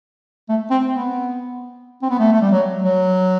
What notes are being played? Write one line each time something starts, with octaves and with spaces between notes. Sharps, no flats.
A3
C4
B3
C4
B3
A3
A3
G3
F#3
F#3